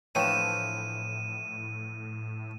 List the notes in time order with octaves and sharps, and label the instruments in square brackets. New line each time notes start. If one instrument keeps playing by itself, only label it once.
[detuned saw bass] A2 [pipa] D3 C#5 G5 [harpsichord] E3 F3 [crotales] D#7 E7